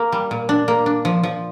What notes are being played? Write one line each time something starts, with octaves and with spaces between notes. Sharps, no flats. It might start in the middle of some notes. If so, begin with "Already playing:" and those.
Already playing: A#3
G3
A#2
D4
A#3
D4
F3
F3